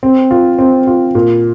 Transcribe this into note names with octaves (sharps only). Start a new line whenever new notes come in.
C4
F4
C4
F4
A#2